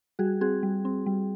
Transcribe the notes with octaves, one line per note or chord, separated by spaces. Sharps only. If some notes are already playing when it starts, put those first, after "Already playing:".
G3 F#4 G#4
C4 F#4 G#4
G3
C4
G3